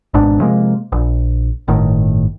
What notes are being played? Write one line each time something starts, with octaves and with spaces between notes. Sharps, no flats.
G#1 G#2 B2 D4
C3 F3 G#3 A#3
A#1
G1 A2 D#3